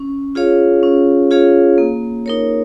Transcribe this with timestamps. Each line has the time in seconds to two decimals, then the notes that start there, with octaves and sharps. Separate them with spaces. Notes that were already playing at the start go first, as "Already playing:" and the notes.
Already playing: C#4
0.35 F4 G#4 C#5 F5
0.83 C#4
1.31 F4 G#4 C#5 F5
1.78 A#3
2.26 D#4 A#4 C#5